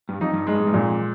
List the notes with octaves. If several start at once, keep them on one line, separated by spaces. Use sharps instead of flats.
G2
F2 D#4
G2
G2 G#3
G#2
G2
F2 A#2